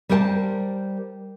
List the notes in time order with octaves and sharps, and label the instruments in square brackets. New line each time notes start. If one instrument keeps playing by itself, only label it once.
[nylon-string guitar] G3 A#4 C5 G5 A5